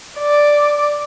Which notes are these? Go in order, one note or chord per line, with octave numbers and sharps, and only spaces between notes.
D5